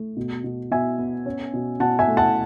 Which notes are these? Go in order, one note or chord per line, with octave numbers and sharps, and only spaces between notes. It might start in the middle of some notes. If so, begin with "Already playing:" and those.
Already playing: A3
B2
B2
B2 E5 G#5
B3
C#4
B2
B2 F#5 A5
E5 G#5
A3
F#5 A5